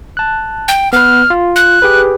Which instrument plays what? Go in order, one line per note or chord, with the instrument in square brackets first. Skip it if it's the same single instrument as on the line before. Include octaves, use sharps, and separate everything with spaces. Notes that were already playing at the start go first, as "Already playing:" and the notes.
[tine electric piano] A5 F#6
[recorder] G5
[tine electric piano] B3 B4 [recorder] F6
[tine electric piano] F4
[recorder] F#6
[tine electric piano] G4 G#4 B4